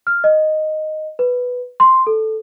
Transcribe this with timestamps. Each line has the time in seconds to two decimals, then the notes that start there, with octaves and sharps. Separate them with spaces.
0.07 F6
0.24 D#5
1.19 B4
1.80 C6
2.07 A4